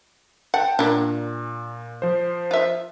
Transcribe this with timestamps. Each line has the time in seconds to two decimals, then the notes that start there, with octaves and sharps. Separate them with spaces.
0.54 F#5 G5 A5
0.79 A#2 A#3 D4
2.02 F3 C5
2.51 F4 E5